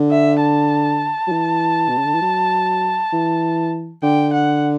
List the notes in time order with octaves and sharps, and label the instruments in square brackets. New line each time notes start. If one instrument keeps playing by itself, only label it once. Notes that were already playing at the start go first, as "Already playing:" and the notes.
Already playing: [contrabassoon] D3
[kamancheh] E5
A5
[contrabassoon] F#3
E3
B2
C#3
D3
E3
F#3
E3
[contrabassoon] D3 [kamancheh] G5
[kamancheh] F#5